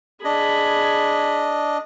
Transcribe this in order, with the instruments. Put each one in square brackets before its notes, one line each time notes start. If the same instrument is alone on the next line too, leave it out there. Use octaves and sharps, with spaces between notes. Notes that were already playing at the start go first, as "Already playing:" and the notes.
[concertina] D4 D#5 [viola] G#4 B5